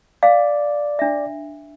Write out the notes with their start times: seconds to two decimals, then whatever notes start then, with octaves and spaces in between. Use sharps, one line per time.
0.23 D5 F5
0.99 D4 E5